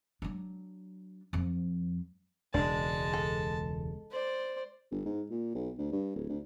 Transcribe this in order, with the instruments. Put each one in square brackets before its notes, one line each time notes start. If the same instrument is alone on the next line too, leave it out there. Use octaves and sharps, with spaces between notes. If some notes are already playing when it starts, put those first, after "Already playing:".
[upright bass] F#3 D4
F2 F3
[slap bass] E1 C#2 [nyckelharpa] G#3 A5 [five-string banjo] D4
[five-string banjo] A4
[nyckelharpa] C5 D5
[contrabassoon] G1
G#2
A#2
B1
D2
G2
D1
D2